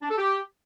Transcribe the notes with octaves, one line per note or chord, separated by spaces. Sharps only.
D4
A4
G4